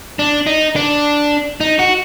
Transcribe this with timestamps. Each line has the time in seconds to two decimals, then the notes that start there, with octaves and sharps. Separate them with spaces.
0.19 D4
0.47 D#4
0.76 D4
1.61 D#4
1.79 F#4